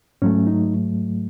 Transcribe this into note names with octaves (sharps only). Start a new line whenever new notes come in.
G#2 F#3 A3 C#4
D#4